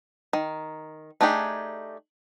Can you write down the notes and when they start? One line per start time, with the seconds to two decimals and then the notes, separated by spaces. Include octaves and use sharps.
0.33 D#3
1.21 A3 D4 D#4 G4 G#4